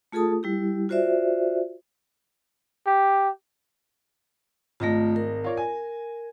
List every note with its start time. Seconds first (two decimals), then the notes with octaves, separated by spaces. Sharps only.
0.12 A3 F4 G#4 A4 A5 D#6
0.43 G3 E4 G4
0.89 F4 F#4 C5 D5 E5
2.87 G4
4.80 G#1 A3 F4 D#5 A#6
5.16 A#4
5.44 F4 C#5 D5
5.57 G#5